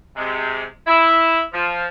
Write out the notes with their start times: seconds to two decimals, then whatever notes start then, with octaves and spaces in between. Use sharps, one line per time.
0.17 C3 G#3
0.87 E4
1.53 F3